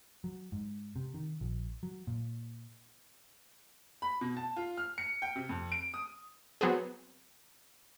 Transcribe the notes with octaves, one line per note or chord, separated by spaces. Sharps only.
F#3
G#2
C3
D#3
A#1
F#3
A#2
B5
B2
A5
F4
F6
C#7
G5
C3
F2
D7
D#6
F#3 B3 C4 G#4